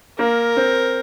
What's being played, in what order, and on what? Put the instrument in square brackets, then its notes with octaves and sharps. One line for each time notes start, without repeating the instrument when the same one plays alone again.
[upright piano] A#3 [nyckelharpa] A#4
[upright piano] C4